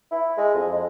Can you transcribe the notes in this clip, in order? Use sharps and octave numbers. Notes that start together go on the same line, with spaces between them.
E4
G#3
F2